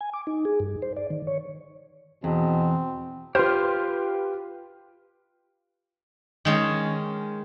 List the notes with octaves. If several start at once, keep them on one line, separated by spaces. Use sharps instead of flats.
G#5
D6
D#4
G#4
G2
C5
D5
D#3
C#5
E2 B2 C4
F4 G4 B4 C5 C6 F6
D#3 G#3 C#4